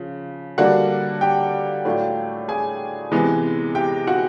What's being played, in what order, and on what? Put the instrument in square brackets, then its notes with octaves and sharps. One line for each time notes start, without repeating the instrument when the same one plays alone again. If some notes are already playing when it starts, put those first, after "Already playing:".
Already playing: [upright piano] C#3 F3
D3 G3 A#3 D4 F#4 F#5
G4 G5
A2 F#3 A3 D4 F4
G#4 G#5
C3 E3 G#3 B3
G4 G5
F#4 F#5